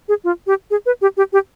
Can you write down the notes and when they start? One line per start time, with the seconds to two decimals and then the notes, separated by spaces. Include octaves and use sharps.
0.08 G#4
0.24 F4
0.47 G4
0.71 G#4
0.86 B4
1.02 G4
1.17 G4
1.33 G4